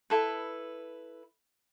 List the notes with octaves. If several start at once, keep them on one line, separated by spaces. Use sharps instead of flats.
E4 A4 B4